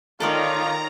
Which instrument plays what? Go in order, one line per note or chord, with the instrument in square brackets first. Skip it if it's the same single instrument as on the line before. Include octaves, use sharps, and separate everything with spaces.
[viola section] D#3 D#4 C#5 [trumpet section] F4 [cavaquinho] A4 A#4 D5 [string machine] A#5